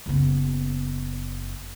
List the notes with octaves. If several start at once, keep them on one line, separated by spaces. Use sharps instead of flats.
F#1 B3